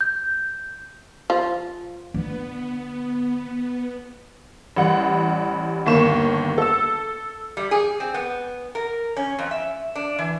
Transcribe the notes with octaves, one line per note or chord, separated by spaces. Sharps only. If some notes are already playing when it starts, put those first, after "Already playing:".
G6
F3
D3 B3
A1 G3 F#5
G1 D#2 A#3 C#6 E7
A4 E6
G3
G#4
C4
B3
A#4
C#4
F2
E5
D4
E3